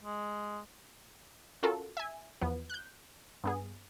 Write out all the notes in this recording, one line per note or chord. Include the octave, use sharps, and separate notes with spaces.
G#3
C#4 F4 F#4 A4 A#4
E5 G#5
E2 F3 B3
F#6 G6
G2 B3 G#4